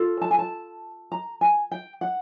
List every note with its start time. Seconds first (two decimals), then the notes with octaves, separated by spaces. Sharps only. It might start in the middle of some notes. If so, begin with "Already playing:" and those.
Already playing: F4 A4
0.22 A5
0.31 G#5
0.39 A5
1.12 A#5
1.41 G#5
1.71 G5
2.01 F#5